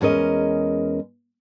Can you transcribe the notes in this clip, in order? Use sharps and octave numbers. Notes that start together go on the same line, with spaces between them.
E2 G#3 C#4 A#4 D#5